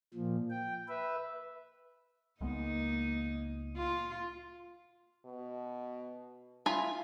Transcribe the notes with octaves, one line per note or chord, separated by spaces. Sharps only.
A#2 F3
G5
B4 E5
C#2 G#3 A#3 B3 D#4
F4
B2
E4 F4 G#5 B5